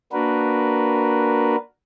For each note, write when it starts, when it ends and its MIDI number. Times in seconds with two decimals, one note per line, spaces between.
0.13 1.56 58
0.13 1.56 62
0.13 1.56 66
0.13 1.56 70
0.13 1.56 71